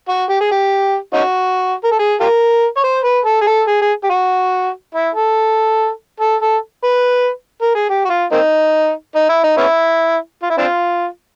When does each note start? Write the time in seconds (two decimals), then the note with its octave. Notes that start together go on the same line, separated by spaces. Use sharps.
0.08 F#4
0.29 G4
0.41 G#4
0.51 G4
1.14 C#4 D#4 F#4
1.84 A#4
1.91 A4
1.99 G#4
2.20 F4 G4 A#4
2.77 C#5
2.84 C5
3.04 B4
3.25 A4
3.41 G#4
3.47 A4
3.68 G#4
3.82 G#4
4.04 G4
4.10 F#4
4.95 E4
5.15 A4
6.20 A4
6.41 A4
6.84 B4
7.62 A#4
7.75 G#4
7.89 G4
8.05 F#4
8.10 F4
8.32 A#3 C4 D#4
9.16 D#4
9.29 E4
9.43 D#4
9.57 B3 C#4 E4
10.42 F4
10.50 E4
10.58 C4 D4 F4